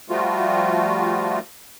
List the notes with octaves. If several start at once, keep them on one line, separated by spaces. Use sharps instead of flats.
F3 G3 A3 F4 F#4